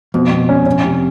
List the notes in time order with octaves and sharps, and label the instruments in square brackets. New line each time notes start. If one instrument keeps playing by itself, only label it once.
[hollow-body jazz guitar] F2 [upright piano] B2
[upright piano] B2
C#4
C#4
C3